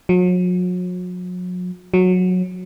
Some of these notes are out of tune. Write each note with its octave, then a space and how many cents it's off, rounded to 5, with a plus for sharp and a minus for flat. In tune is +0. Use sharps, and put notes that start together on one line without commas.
F#3 -40
F#3 -15